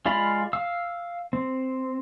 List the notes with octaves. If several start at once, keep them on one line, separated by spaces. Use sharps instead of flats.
G#3 F4 D5 F5 B5
F5 E6
C4